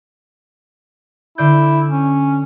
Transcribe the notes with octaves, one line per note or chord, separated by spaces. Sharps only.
D3 E4 D5 G6
C#4